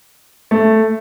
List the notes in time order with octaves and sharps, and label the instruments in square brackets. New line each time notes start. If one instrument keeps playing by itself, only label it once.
[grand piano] A3